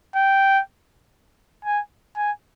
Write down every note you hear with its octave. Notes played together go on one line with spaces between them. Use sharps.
G5
G#5
G#5